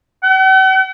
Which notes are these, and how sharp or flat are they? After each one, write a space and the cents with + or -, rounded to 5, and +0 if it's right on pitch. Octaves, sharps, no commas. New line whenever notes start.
F#5 +45